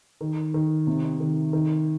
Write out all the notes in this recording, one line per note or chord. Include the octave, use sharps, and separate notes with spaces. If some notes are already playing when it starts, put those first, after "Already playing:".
D#3
D#3
C3
D#3
D#3